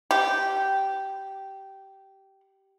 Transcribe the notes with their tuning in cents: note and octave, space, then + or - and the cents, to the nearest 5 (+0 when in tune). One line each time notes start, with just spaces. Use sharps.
G4 -15